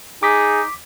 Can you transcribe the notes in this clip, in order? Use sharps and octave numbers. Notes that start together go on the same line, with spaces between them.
D#4 G#4 D6 B6